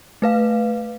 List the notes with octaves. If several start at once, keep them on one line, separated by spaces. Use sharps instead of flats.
A3 B4 F5